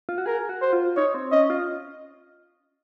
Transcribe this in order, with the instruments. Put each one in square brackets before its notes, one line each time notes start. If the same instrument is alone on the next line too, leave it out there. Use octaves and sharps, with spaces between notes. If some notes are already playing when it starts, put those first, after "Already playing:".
[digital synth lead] F4
F#4
[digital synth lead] G#4 [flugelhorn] A#4
[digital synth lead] F#4
[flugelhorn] C5
[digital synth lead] F4
[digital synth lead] D#4 [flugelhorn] C#5
[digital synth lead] C4
[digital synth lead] C#4 [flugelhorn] D#5
[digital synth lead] F4